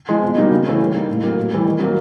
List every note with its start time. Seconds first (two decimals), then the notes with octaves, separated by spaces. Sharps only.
0.09 F3 G#3
0.22 B2
0.36 G3 A#3 D#4 F#4
0.51 C#3
0.66 E3 A3 C#4
0.80 G3
0.93 A#3 D#4
1.09 A2
1.23 F#3 A#3
1.38 A2
1.51 E3 G3
1.65 D#3
1.79 F#3 A#3